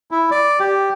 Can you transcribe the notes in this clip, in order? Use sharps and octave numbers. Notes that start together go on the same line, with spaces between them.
E4
D5
G4